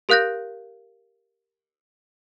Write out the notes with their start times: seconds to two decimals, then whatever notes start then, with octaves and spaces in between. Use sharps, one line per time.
0.09 G4 A#4 F5 F#6 G6 A#6